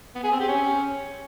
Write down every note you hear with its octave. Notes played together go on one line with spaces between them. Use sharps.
B3
G#4
C4
G4
C#4